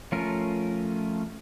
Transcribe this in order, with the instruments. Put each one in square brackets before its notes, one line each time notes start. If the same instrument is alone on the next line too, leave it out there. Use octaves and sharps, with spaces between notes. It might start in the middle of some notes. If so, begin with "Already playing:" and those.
[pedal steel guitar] F3 A3 C#4 F4 A#4